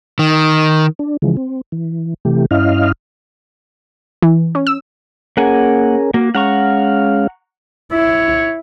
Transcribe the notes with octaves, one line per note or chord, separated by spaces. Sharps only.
D#3
D4
C#3 E3 F3 G#3
C4
E3
C3 E3 A3 G4
G2 C#4 E4 D#5 F5 F6
E3
C#4
E6
A#3 C#4 G#4 A#4 F#5 G#5
A#3 F#4
G#3 C#4 F5 F#5 A#5 C#6
E4 C#5